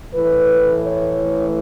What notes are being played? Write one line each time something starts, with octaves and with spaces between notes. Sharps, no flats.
A2 E3 A3 B4
C#5